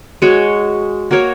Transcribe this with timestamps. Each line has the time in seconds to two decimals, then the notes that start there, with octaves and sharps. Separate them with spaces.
0.22 G#3 F#4 C#5
1.11 A#3 F#4 A#4 C#5